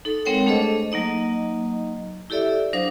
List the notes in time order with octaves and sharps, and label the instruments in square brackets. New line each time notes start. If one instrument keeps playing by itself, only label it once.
[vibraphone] D#4 A4
G#3 C4 A#4 C#5 F#5 G5
A3 D4 G#4 A4 C5 D#5
F#3 A#3 D#4 D#5
E4 G4 A4 D5 E5
F#3 D4 C5 F5 D#6